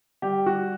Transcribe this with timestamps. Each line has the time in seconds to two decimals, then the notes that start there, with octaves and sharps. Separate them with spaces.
0.22 G3 G4
0.46 G3 F#4